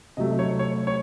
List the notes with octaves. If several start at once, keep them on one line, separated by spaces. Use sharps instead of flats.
C3 F#3 A3 D#5
C#5
C#5
C#5